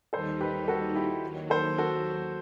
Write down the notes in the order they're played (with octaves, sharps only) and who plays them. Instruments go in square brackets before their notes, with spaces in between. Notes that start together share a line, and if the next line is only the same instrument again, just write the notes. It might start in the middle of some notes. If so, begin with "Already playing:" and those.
[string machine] D#2 D#3 G3 D#4 [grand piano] A4 C5
[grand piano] G4 B4
F#4 A4
E4 G4
[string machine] D#2 D#3 F#3
[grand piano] A4 C5
F#4 A4